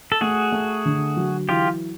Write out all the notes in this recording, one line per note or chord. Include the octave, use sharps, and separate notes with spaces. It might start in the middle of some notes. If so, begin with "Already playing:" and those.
A4
A3 F#4 G#4
A3
D3
F#3
E3 F4 G4